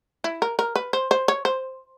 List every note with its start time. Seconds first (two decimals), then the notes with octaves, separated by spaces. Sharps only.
0.24 E4
0.42 A#4
0.59 A#4
0.76 B4
0.93 C5
1.11 C5
1.28 C#5
1.45 C5